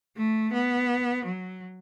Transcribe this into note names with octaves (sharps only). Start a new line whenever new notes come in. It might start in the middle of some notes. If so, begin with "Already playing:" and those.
A3
B3
F#3